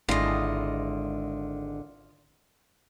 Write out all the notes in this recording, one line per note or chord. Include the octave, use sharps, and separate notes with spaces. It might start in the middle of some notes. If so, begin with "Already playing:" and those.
G#1 D3 G#3 E4 F4 D#5